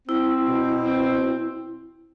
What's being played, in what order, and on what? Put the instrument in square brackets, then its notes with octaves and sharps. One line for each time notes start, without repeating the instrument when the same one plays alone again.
[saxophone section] C4 [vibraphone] E4
[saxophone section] B2
C4